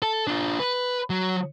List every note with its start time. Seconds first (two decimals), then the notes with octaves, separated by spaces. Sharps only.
0.02 A4
0.27 D4 F4
0.59 B4
1.10 F#3